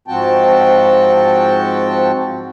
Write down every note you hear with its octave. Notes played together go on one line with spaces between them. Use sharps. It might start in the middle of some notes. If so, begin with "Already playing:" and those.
G#2 F3 C4 F#4 G5 A5